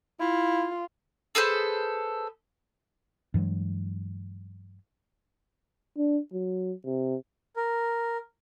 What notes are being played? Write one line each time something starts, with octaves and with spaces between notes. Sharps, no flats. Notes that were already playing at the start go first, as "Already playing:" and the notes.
E4 F4
G#4 A4 B4 C5
G2 E3 F#3 G#3
D4
F#3
C3
A#4